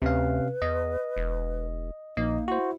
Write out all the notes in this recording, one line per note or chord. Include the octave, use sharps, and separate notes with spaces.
D2 C3 C#4 B4 F5
E2 D#5
E1
A#1 A#3 D#4 D#5
E4 F#4 C5